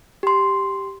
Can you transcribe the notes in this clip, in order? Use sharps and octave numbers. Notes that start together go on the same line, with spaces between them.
G4 C6